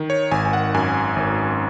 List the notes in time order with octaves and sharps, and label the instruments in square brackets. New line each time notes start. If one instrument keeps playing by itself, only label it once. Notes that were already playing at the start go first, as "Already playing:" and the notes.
Already playing: [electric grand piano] D#3
C#5
G#1 G#5
G#5
F#5
F#2 G#5
G#1